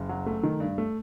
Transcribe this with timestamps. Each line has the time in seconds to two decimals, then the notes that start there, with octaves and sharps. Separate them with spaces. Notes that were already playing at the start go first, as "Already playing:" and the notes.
Already playing: F#1
0.09 F#3
0.26 A3
0.43 D#3
0.60 G2
0.78 A3